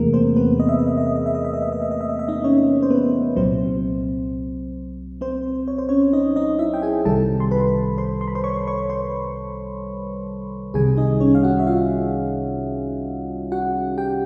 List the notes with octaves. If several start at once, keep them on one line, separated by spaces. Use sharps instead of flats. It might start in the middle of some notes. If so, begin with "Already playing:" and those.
Already playing: E2 C3 E3 A3 A#3 G#4 A#4
C4 C5
B3 B4
D#5
E5
D#5
E5
D#5
E5
D#5
E5
D#5
E5
D#5
E5
D#5
E5
D#5
E5
D#5
E5
D#4 D#5
C#4 C#5
C5
B3 B4
C2 A#2 F#3 C4 C5
C4 C5
C#5
C5
C#4 C#5
D#4 D#5
D#4 D#5
E4 E5
G5
G#4 G#5
C2 C3 D#3 G3 A4 A5
C6
B4 B5
C5 C6
C6
B5
C5 C6
C#5 C#6
C#5 C#6
C5 C6
C2 C3 D#3 G3 G#4 G#5
D#4 D#5
C#4 C#5
F5
F#4 F#5
E5
F4 F5
F#4 F#5
G4 G5